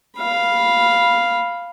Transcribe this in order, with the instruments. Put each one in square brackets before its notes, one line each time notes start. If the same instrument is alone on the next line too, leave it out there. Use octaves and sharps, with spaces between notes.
[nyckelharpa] F5 B5